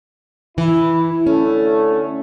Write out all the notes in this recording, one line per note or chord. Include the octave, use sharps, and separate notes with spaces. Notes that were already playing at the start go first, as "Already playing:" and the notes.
E3 E4
D3 A3 C#4